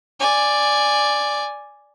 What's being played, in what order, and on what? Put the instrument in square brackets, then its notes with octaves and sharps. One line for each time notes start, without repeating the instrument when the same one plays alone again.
[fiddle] D5 G#5